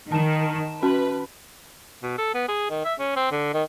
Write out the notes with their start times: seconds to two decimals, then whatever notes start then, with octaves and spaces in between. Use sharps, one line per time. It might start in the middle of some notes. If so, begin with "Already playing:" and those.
0.12 D#3 A5 E7
0.83 C#4 F#4 B4 A5
2.03 B2
2.18 A4
2.34 B3
2.48 G#4
2.70 D#3
2.85 E5
2.99 C#4
3.16 C4
3.32 D3
3.54 D#3